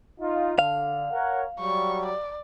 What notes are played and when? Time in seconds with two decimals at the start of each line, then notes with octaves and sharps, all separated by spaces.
0.21 D#4 F4
0.59 D3 F5
1.12 A#4 C#5 F#5
1.60 F#3 G3 C#6
2.06 D5